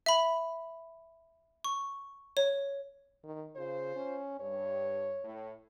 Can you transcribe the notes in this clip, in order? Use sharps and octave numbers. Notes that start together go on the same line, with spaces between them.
E5 B5
C#6
C#5
D#3
C#3 F4 C5
C#4
G2 C#5
A2